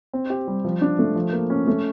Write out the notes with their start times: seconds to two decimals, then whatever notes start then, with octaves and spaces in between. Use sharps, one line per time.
0.13 C4
0.30 G4
0.48 G3
0.64 F3
0.82 D4
0.99 A3
1.15 F3
1.33 A#3
1.50 C#4
1.67 A3